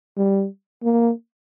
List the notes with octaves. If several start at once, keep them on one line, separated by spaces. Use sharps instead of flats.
G3
A#3